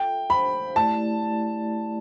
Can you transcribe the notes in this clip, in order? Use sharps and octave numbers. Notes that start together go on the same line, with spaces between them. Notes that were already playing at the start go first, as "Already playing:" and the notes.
Already playing: F4 A4 E5 G5
D4 G4 C5 F5 B5
A3 E4 G4 D5 A5